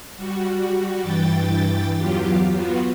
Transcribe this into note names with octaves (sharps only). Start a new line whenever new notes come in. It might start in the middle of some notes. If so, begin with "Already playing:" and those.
G3 F#4
G2 E3 G5 A6
E2 F#3 F4 G4
B3 F4 F#4